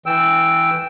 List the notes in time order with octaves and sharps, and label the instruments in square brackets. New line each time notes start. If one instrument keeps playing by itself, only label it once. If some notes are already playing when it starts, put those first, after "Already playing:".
[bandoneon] E3 G5 E6